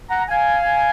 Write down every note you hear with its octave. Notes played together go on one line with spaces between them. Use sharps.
F#5 A#5
F5 G#5